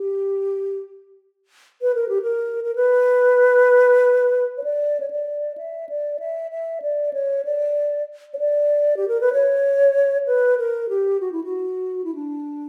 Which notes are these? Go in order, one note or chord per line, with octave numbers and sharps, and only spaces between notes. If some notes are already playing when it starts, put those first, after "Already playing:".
Already playing: G4
B4
A#4
G4
A#4
A#4
B4
C#5
D5
C#5
D5
E5
D5
E5
E5
D5
C#5
D5
C#5
D5
G4
A#4
B4
C#5
B4
A#4
G4
F#4
E4
F#4
E4
D4